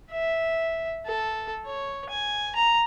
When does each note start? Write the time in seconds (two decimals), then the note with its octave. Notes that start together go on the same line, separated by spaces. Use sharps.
0.12 E5
1.07 A4
1.66 C#5
2.10 G#5
2.55 A#5